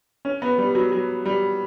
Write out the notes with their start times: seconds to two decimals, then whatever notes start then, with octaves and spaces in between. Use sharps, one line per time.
0.25 C#4
0.42 B3
0.58 G3
0.75 F#3
0.92 F#3
1.25 G3